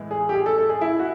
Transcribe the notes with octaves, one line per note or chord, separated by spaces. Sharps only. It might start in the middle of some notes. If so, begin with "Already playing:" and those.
Already playing: A2 E3 G#3
G#4
G4
G#4
A4
A4
G#4
E4
F#4